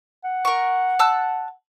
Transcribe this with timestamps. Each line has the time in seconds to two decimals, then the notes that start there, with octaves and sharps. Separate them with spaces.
0.24 F#5
0.45 A#4 C#6
0.99 A5 E6 F#6